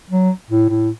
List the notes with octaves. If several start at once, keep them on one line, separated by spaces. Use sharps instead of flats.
F#3
A2
A2